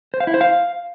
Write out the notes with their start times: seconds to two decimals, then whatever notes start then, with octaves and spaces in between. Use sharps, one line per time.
0.14 C5
0.20 F5
0.27 E4
0.34 C5
0.41 F5